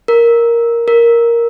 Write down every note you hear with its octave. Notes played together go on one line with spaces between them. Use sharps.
A#4
A#4